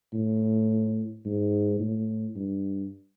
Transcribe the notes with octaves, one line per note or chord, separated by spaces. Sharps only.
A2
G#2
A2
G2